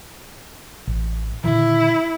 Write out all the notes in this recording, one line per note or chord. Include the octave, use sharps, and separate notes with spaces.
A1
A#2 D3 D#3 E4